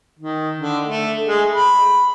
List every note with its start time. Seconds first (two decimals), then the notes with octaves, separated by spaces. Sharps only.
0.19 D#3
0.58 D3
0.88 A3
1.26 G#3
1.54 B5